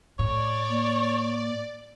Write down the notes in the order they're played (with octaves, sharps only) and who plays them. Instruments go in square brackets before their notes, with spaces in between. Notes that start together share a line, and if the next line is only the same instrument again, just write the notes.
[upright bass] A2 [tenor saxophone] C#5 [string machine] D5
[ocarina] A#3